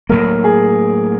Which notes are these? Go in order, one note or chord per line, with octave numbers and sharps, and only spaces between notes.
A2 F#3 A#3 A#4
G#4